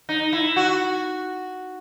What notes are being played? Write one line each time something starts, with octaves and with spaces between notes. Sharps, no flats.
D#4
E4
F#4